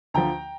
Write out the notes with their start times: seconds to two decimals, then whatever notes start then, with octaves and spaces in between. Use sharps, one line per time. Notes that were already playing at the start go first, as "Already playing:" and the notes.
0.14 D2 D3 F3 G5 A#5